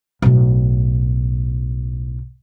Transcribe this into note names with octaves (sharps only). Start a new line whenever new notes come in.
B1 A2